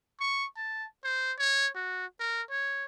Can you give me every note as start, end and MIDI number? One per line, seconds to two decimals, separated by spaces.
0.20 0.46 85
0.57 0.86 81
1.04 1.33 72
1.38 1.68 73
1.75 2.05 66
2.20 2.42 70
2.50 2.85 73